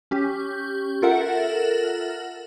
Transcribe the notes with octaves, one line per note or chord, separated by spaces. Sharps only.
C#4 G4
F4 A4 A#4 E5 F#5